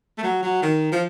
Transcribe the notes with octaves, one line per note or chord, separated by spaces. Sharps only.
A3
F#3
F#3
D#3
F3